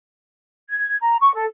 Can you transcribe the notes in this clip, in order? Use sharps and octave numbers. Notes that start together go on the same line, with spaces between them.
G#6
A#5
C#6
A4